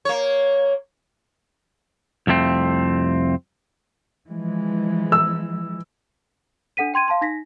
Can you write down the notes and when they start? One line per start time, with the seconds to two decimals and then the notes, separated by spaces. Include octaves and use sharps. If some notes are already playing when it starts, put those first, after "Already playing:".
0.05 A#3 C#5
2.27 C2 F2 A3 C4
4.30 E3 F3 G#3
5.12 E6
6.77 D4 A4 F#5 B6 D#7
6.94 G5 C6 G#6 D#7
7.08 F5 A5 C6
7.21 D#4 A#6 B6